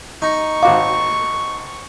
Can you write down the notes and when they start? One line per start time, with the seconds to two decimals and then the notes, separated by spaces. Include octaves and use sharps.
0.22 D#4 C#6
0.63 G#1 F#4 F5 D6